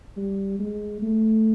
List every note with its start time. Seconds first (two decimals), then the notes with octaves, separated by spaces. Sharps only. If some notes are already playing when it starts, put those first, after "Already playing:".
0.17 G3
0.59 G#3
1.02 A3